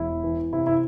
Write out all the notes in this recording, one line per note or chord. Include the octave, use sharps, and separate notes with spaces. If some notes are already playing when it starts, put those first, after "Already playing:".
Already playing: E1 E4
E3
C3 E4
E4